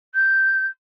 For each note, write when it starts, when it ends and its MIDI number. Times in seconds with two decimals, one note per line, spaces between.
0.14 0.67 91